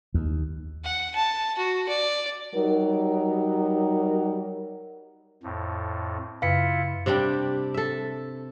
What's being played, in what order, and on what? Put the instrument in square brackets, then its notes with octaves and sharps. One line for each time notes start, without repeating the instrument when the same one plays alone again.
[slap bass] D#2
[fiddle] F#5
A5
F#4
D5
[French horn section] F#3 G3 D#4 A#4
[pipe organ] F2 A2
[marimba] F#2 C#3 B4 [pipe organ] E4 F4 [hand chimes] F5 B6 C#7
[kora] C3 G3 D4 G5
A4 E5